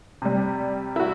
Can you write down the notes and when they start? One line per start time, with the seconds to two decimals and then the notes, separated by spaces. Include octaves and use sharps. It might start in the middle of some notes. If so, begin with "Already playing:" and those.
0.22 C3 G3
0.96 E4 F#4